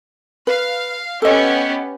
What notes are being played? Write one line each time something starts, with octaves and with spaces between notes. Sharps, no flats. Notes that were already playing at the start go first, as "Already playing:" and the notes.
B4 F5
B3 C#4 G4 A4 D#5